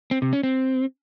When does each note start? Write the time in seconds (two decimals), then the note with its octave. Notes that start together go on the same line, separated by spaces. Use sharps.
0.11 C4
0.22 C3
0.33 C#4
0.43 C4